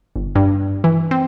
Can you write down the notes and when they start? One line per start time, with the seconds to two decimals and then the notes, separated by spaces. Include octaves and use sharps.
0.16 G1
0.35 G2
0.84 E3
1.11 C4